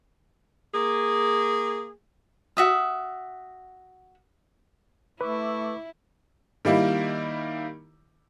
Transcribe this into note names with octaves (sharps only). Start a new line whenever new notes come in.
A#3 G#4
F#4 E5 D#6
A3 E4 B4 C#6 D6 E6
D#3 G3 A#3 E4